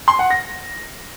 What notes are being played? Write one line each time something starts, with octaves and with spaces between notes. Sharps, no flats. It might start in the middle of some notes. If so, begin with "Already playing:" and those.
C6
F#5
A#6